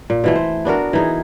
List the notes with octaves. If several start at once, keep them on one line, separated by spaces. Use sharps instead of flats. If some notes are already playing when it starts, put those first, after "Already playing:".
A#2
B2 E3 A3
C5
B3 D4 F#4 A#4
E3 D#4 G#4